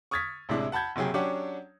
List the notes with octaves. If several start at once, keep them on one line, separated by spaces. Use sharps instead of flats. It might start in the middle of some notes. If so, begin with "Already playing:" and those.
C#6 D#6 F6 G#6 A6 B6
A1 C3 G#3 D4 E4
F#5 A5 B5 G6 G#6
F#1 C3 F#3 G#4 G5
F#3 C#4 D4 G4 C#5 F#5